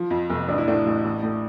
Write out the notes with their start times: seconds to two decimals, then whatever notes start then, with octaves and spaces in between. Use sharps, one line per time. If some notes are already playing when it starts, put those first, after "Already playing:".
Already playing: F3
0.11 F2
0.30 F1
0.48 A1 D4
0.58 E4
0.67 A2 D4
0.86 A1
1.04 A1
1.23 A2